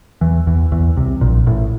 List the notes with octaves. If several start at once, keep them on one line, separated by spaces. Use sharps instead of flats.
E2 E3
E2 E3
E2 E3
C2 C3
A#1 A#2
A1 A2